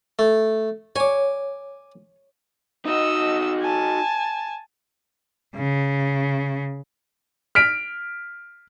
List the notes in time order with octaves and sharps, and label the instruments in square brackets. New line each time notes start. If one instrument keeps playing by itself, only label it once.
[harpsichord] A3
[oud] C#5 [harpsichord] G#5 D6
[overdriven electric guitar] D#4 F#4 [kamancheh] D#5 E6
[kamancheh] G#5 A5
[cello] C#3
[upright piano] F6 B6 D7